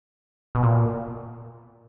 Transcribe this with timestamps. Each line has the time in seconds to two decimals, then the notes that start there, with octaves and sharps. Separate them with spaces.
0.55 B2
0.63 A#2